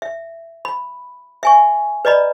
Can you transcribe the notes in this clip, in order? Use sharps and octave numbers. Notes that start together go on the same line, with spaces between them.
E5
B5
E5 G#5 C#6
B4 D5 D#5 A#5 B5